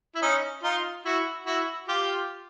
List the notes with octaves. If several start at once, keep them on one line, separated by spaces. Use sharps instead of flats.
E4
C#4 D#4
D#4 F4
E4 F#4
E4 F#4
F4 G4